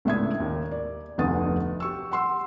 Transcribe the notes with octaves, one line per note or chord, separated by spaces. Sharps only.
C#2 A2 D4 E5 D#6 G#6
D#2
D5
F1 D2 B3 D#6 A6
G4 C#6 E6
F#5 C6 E6